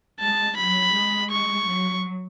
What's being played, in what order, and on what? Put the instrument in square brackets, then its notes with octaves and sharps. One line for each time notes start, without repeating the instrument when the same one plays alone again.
[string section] G#3 [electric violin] A5
[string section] F#3 [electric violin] B5
[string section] G#3
[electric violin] C#6
[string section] F#3